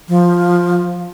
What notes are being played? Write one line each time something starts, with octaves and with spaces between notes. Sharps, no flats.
F3